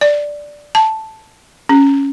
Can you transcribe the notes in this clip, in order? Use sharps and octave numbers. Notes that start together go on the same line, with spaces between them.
D5
A5
C#4